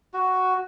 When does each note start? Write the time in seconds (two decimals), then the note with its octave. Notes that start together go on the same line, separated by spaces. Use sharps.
0.14 F#4